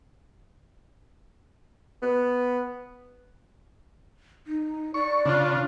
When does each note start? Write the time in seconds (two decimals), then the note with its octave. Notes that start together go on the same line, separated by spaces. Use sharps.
2.03 B3
4.47 D#4
4.94 D5 C#6
5.25 C#3 D4 F4